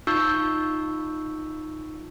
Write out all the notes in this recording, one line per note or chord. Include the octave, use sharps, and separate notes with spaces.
D#4 F4 C#6 E6 G6